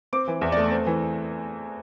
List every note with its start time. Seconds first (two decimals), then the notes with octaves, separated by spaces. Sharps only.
0.13 C4 D6
0.28 E3
0.41 E2 E5
0.52 D5
0.57 A3
0.71 C4
0.86 E3